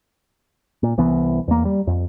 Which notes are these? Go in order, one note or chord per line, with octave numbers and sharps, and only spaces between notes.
A#2
C2 E3 B3
E2 A#3
G3
F2